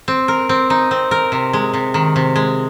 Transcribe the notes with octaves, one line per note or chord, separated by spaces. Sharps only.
C4
A#4
C4
D#4
C4
A#4
C3
G#3
C3
D#3
C3
G#3